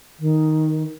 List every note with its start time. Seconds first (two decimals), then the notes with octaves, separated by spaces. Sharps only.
0.19 D#3